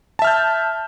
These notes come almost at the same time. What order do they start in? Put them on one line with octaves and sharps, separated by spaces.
A5 E5 F6 G6